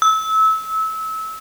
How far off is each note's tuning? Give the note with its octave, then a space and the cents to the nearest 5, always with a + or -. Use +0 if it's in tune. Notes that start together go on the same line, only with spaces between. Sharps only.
E6 -25